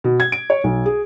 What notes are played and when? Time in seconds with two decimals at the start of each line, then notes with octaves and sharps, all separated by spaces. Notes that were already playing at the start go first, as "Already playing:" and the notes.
0.04 B2
0.20 G#6
0.32 D7
0.50 C#5
0.64 B1
0.86 G#4